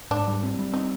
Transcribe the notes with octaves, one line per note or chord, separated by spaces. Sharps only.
G#2 D4
G3
C4
G3
C4 D#4